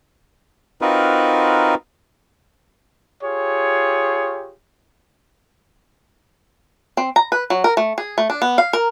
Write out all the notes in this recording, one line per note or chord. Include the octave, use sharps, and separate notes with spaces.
C4 D#4 F4 F#4 A#4 B4
F4 G4 G#4 C#5
C4
A#5
B4
F#3
A#4
A3
G#4
A3
D4
B3
F5
A#4